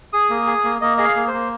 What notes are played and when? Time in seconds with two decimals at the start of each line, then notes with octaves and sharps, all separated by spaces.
0.13 G#4 D#6
0.30 A#3
0.47 G#4
0.64 A#3
0.81 A#3 D#5
0.97 G#4 D#5
1.05 F5
1.16 A#3
1.28 C5
1.33 A#3